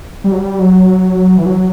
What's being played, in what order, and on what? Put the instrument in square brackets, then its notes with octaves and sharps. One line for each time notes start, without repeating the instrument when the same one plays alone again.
[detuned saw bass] G3
F#3
G3
F#3
E3
F#3